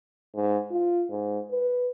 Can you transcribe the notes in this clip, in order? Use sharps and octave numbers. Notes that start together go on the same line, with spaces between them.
G#2
F4
G#2
B4